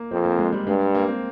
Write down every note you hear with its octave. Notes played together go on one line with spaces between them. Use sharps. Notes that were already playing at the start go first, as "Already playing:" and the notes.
Already playing: A#3
F2 C4
A#3
G#3
G3
G2 G#3
A#3
C4